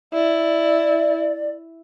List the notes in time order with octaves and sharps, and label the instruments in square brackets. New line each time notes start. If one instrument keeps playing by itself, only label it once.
[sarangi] E4 [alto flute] D5